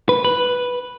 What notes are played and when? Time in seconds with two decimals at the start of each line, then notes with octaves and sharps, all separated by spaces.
0.09 B4
0.25 B4